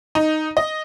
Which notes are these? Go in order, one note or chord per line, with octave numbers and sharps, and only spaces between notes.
D#4
D#5